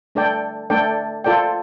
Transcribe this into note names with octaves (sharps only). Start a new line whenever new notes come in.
A3 D4 A4 D5 G5
A3 D4 A4 D5 G5
F4 A4 D5 G5